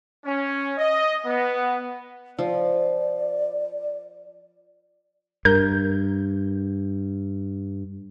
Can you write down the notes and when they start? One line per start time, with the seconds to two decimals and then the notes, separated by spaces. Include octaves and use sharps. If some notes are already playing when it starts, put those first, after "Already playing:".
0.25 C#4
0.78 D#5
1.26 B3
2.39 F3 D5
5.45 G2 A#4 G6